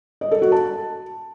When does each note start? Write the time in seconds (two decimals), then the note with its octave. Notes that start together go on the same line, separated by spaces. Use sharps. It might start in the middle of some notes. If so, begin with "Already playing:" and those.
0.21 D#5
0.31 A4
0.42 F#4
0.52 A5